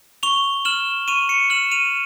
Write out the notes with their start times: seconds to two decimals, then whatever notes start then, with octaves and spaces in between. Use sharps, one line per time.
0.23 C#6 F7 G7
0.65 F6 E7 F#7
1.08 C#6 D#7 F7
1.29 C#7 D#7
1.50 F6 E7 F#7
1.72 D#7 F7